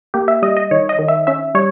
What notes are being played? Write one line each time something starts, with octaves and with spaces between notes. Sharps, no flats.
A#3 G4
E5
G3 D#5
D#5
D#3 C#5
D#5
D#3
E5
C#4 E5
G3 C#5